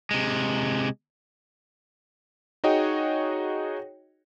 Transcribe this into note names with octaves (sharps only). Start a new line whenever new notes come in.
C3 G#3
D#4 F#4 G#4 C#5 D#5 G5